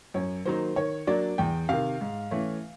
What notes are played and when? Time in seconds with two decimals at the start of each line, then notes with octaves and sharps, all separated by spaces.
0.14 F#2 C#5
0.45 D#3 F#3 A#3 D#4 C5
0.76 D#3 C#5
1.07 F#3 A#3 D4 D5
1.38 E2 G5
1.69 C3 D#3 F5
2.01 G#2
2.31 E3 A3 C#4